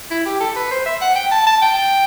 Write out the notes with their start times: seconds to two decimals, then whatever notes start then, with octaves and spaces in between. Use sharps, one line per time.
0.11 E4
0.26 G4
0.41 A4
0.56 B4
0.71 C5
0.86 E5
1.02 F#5
1.16 G5
1.32 A5
1.47 A5
1.62 G5